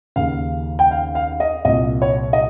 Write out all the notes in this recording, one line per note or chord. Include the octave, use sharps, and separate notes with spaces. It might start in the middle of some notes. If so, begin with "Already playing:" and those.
D#2 C#3 F5
G5
F5
F5
D#5
C2 A#2 D#5
C#5
D#5